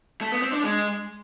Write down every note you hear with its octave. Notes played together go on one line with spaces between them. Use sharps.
A3
B3
C4
D4
G#3